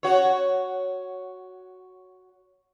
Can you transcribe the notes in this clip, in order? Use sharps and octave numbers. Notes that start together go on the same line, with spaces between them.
F#4 C#5